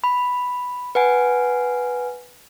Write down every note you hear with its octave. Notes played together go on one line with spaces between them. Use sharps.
B5
B4 F#5 G#5